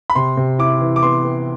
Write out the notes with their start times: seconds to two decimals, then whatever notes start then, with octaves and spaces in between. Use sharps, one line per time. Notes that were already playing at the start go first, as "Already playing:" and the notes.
0.10 B5
0.15 C3 C6
0.37 C3
0.59 E4 D6
0.81 E3
0.96 D6
1.02 B3 C6
1.25 B3